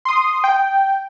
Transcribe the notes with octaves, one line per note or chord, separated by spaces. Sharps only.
C6 D#6
G5